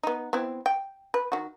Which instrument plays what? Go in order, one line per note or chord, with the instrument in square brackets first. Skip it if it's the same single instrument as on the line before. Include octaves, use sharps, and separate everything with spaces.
[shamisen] B3 D#4
B3 C4 E4
G5
B4
D#3 F#4